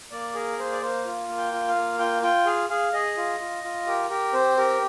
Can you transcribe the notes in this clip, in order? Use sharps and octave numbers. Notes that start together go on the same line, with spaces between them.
A#3 D5
G#4 A#4
A#3 C5
D5
A#3 C5
F4
A#3
G5
F4
F5
A#3
F4 G5
F4 G5
G#4 F5
G#4 F5
G#4 D#5
F4
F4
F4
G4 A#4
G4 A#4
C4 C5
G4 A#4